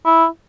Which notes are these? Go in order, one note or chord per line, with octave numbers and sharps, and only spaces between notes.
E4